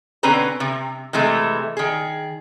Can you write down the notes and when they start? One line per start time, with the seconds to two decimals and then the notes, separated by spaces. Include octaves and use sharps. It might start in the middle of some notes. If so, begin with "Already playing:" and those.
0.23 B2 D3 C4 C#4 B4 A#5
0.60 C3
1.13 C3 E3 G#3 A3
1.77 D#3 G#4